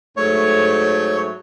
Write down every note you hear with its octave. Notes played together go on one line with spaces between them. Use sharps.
G#2 F#3 A3 C#5